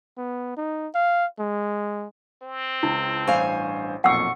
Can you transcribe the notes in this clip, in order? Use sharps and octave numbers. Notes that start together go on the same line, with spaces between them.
B3
D#4
F5
G#3
C4
C#2 E4 A5
A1 G2 C5 F5 G#5 C#6
B1 F2 A#2 F#5 C#6 E6